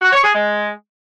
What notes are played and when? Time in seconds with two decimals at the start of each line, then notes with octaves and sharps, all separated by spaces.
0.02 F#4
0.13 C#5
0.23 G#4
0.34 G#3